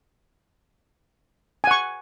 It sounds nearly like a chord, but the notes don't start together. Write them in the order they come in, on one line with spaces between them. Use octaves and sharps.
G#5 F#5 C#6